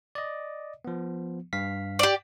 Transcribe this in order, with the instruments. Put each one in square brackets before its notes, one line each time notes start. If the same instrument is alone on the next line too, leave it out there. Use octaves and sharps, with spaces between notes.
[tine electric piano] D5 D#5
F3 B3
G2 F5 B6
[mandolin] G4 D5